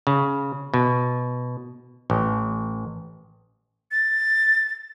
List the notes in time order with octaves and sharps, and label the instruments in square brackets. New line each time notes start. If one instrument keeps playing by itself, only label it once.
[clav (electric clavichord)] C#3
B2
A1
[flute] A6